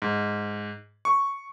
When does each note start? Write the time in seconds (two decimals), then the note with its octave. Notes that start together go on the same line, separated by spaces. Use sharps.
0.02 G#2
1.05 C#6